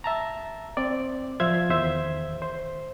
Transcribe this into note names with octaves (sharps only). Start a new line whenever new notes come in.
E5 A5 A#5
C4 D5
F3 C5 E5 F5 G#6
E2 D#3 C5 E5
C5